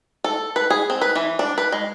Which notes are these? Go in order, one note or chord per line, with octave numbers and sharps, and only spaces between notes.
A4
B4
G#4
C4
B4
E3
D4
B4
G#3